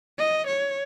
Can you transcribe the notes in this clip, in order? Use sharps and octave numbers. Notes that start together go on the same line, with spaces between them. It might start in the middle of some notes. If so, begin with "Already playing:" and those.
D#5
C#5